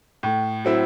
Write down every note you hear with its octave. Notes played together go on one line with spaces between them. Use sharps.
A2
F#3 C4 E4